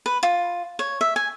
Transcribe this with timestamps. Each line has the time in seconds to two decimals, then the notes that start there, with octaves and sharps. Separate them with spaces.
0.06 B4
0.23 F4
0.79 C#5
1.01 E5
1.16 G#5